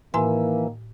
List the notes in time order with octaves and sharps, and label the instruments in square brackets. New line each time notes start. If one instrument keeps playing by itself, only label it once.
[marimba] A2 G#5 C6 [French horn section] D#3 A#3 [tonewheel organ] E3